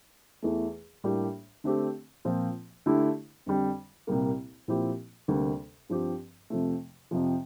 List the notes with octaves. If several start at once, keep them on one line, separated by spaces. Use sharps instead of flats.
E2 E3 A3
A2 G3 A#3 D4 G4
D3 A3 C4 G4
A#2 F3 C4 F4
D3 A3 E4 G4
F2 D3 G3
C2 A#2 G3 A#3
A#2 F3 C4 E4 G4
D2 C3 G3 A#3
G2 F3 C4 G4
F2 C3 F3 A3
F2 C3 F3